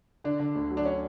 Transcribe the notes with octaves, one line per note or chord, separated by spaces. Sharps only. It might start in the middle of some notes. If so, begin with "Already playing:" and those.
D3 D4
D3
D2
F#3
D4
C#4